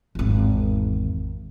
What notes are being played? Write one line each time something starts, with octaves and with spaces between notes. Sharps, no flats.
G#1 E2